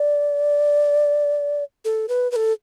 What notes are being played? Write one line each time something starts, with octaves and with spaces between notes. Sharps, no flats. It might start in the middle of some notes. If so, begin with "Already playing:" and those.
Already playing: D5
A4
B4
B4
A4